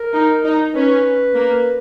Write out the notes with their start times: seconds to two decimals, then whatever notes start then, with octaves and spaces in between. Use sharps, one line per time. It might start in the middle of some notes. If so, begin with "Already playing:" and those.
Already playing: A#4
0.13 D#4
0.44 D#4
0.75 C#4 B4
1.35 A#3